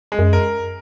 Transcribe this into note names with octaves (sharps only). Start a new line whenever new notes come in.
G#3
F#2
A#4